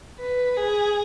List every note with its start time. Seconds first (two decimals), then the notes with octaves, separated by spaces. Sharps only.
0.19 B4
0.57 G#4